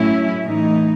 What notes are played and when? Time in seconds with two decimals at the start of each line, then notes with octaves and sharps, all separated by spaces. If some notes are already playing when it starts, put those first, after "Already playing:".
Already playing: A2 F#3 C#4 E4
0.44 A2 E3 A3 D#4